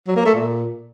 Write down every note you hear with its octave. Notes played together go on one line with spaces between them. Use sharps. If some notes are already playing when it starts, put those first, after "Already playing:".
F#3
A#3
A3
A#2